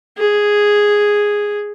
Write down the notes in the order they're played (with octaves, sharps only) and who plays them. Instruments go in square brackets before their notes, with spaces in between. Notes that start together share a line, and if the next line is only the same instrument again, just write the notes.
[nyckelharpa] G#4